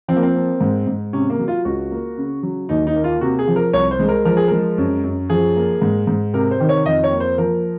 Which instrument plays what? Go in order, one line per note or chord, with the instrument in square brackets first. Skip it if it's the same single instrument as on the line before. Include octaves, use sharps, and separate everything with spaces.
[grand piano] F3 C4
A#3
C4
A#3
G#2
G#2
C3 C#4
A#3
F#3
F4
C#2 F#4
A#3
C#3
F#3
D#2 D#4
D#4
A#3
F4
C3 F#4
G#4
F3
A#4
C2 C#5
C5
G#3
A#4
F3 A#4
G#4
G#3 A#4
F#2
F#2
F3 G#4
A#3
G#2
G#2
C3 A#4
C5
D#3
C#5
F2 D#5
C#5
A#3
C5
F3 A#4